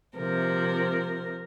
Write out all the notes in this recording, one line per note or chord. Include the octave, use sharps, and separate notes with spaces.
C3 F3 A#4